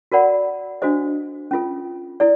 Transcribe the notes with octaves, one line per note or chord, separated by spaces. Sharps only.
F#4 A#4 D5 F#5 B5
D4 F#4 A4 C5 D#5
C#4 F4 A4
E4 A4 D5